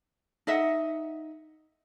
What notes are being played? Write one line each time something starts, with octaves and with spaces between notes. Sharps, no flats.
D#4 D#5 E5 F#5